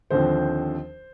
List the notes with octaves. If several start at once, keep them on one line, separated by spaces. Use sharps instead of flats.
D#2 D3 F3 C4 C5